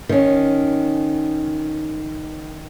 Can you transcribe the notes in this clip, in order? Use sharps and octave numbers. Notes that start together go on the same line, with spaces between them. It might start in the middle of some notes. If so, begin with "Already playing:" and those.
D#3 C#4